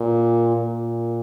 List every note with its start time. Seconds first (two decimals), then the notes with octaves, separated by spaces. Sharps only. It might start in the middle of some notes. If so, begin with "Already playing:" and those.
Already playing: A#2
0.56 A#2